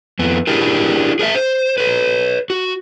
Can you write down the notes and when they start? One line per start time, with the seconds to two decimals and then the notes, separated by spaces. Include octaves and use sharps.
0.19 F2 B3
0.47 D4 E4 G4 G#4 A#4
1.19 G#4 A#4 D5 E5
1.35 C5
1.78 B4 C#5
2.50 F#4